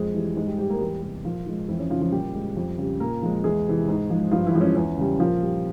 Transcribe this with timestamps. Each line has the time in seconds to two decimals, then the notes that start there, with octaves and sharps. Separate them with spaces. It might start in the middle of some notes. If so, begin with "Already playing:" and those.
Already playing: F2 G#3 G#4
0.14 E3 G3
0.36 G#2 G#3 G#4
0.47 G3 G4
0.59 G3 G4
0.70 A#3 A#4
0.80 E2 G3 G4
1.02 C3 G3
1.24 A#2 F3 F4
1.46 F3 G#3
1.68 F2 E3 E4
1.79 C#4
1.90 C#3 F3 F4
2.01 F3 F4
2.12 A#2 G3 G4
2.34 G#3
2.57 F2
2.78 C#3 G3
3.00 A#2 A#3 A#4
3.23 F3 G#3
3.44 E2 G#3 G#4
3.66 C3 E3
3.88 G#2
4.10 F3 G#3
4.31 G2 F3 F4
4.46 E3 E4
4.54 F3 G#3
4.61 C#4
4.75 E2 C#4
4.98 C#3 G3
5.20 A#2 F3 F4
5.42 G3